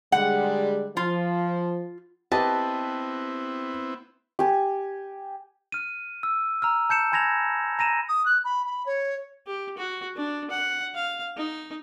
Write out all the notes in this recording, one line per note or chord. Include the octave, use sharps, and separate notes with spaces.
D3 G3 G#3 F#5
F3 F4
B3 C4 E4 G4 B4 D#5 A5
G4 G#5
F6 D#7
E6
A#5 E6 F6
A5 G6 C#7 E7
G#5 B5 G#6 A#6 E7 F7
A#5 A#6 D#7 E7
D#6
F#6
B5
B5
C#5
G4
F#4
D4
F#5
F5
D#4